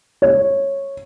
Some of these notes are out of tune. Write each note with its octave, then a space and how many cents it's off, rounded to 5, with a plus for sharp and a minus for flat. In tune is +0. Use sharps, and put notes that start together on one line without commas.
C#5 -10